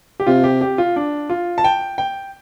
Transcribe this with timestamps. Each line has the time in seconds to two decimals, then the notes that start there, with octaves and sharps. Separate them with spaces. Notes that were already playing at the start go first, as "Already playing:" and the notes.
0.20 G4
0.27 C3 F4
0.44 G4
0.61 G4
0.78 F4
0.96 D4
1.30 F4
1.58 A5
1.64 G5
1.98 G5